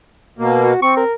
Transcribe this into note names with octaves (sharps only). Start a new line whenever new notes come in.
B2 A#3
F#4
C4 C#6
A#4